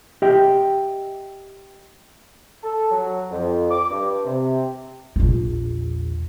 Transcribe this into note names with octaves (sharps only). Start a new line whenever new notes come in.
G4 D#5 E5 G5
A4
F#3
F2
D6
G2
C3
A#1 E2